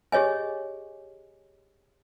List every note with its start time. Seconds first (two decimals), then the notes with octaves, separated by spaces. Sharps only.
0.12 G4 G#4 C#5 D#5 G#5